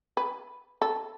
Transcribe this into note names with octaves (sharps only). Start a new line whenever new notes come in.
B4
A4